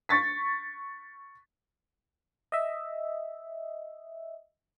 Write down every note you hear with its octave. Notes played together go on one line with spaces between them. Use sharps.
C#6 A6 B6
D#5 E5